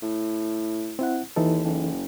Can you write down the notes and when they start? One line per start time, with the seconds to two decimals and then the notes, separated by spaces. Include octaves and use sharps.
0.02 A2
0.99 C4 E4 F#5
1.36 D#2 E3 D#4 A4
1.64 F#1